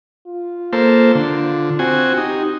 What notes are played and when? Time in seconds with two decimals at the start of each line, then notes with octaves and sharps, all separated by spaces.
0.27 F4
0.73 A#3 A4 C5
1.15 D3
1.79 C4 F#4 G#5
2.18 D#4 G4